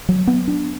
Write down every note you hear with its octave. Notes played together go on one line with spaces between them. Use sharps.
F#3
B3
D4